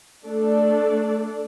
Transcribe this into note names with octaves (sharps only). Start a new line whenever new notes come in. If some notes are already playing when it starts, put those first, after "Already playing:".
A3 D4 A4 D5